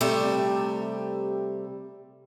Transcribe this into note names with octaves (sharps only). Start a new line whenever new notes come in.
C3 G3 A3 G4 E5